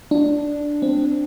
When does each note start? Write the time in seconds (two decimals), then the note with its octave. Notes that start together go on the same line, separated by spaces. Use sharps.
0.11 D4
0.82 C4